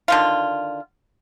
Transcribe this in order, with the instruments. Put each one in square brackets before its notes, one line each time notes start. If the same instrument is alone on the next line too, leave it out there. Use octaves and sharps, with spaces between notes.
[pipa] D3 D#3 F4